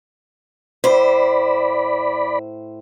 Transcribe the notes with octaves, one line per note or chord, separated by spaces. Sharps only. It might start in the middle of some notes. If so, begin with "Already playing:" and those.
A2 C5 D5 B5